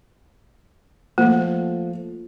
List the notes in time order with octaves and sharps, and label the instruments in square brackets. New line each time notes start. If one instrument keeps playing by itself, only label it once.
[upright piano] F3 A3 [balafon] A#3